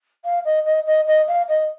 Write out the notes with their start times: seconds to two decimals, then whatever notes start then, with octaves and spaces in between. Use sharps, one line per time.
0.25 F5
0.45 D#5
0.65 D#5
0.86 D#5
1.07 D#5
1.28 F5
1.49 D#5